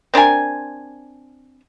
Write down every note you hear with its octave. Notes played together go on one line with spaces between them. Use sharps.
C4 D4 A#4 G#5